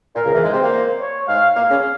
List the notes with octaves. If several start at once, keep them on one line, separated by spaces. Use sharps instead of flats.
A#2 A#4
C#2 C#3
E2 E3
G#2 G#3 C5
C3 C4
A#2 A#3
C#5
G#2 G#3 F5
A#2 A#3 F5
C#3 C#4